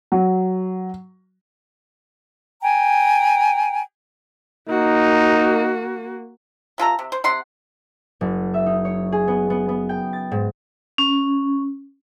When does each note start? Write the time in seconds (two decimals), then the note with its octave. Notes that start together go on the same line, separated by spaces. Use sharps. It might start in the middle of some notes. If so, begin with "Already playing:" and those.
0.12 F#3
2.62 G5 G#5 A#5
4.69 A#3 D#4 F#4
6.78 C3 F4 A4 A#5
6.99 C3
7.12 C5
7.24 C3 F#5 C6
8.21 F#1
8.54 E5
8.66 D#4
8.85 C#5
9.12 G#4
9.28 B3
9.50 B3
9.69 B3
9.89 G5
10.13 A6
10.31 G#2
10.98 C#4